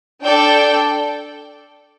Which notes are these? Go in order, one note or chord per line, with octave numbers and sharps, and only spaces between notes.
D4 A4 D5 G5